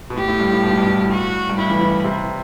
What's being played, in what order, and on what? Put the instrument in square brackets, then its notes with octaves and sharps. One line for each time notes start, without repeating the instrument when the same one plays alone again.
[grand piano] B2
[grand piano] A2 [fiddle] G4
[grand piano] A2
G2
A2
B2
A2
G2
A2
[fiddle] F#4
[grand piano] G2
[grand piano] A2 [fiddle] E4
[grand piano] E3
E3
C3